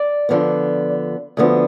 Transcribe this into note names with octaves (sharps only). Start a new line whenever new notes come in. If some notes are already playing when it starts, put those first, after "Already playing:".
Already playing: D5
D3 F3 B3
D2 D3 F3 B3